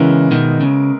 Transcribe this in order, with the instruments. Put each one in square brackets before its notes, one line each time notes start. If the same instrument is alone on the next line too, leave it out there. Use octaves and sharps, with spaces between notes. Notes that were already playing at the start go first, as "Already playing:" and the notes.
Already playing: [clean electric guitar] C#3 E3 [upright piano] G#3 B3 E4 A#4
[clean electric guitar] B2 D#3
C#3